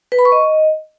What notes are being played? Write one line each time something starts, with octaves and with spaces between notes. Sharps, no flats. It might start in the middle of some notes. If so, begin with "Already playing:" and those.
B4
B5
C#6
D#5